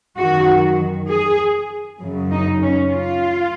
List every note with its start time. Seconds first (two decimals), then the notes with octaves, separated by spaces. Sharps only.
0.18 F#2 D#3 F#4
1.08 G#4
2.01 F#2 C#3
2.31 D#4
2.61 C#4
2.91 F4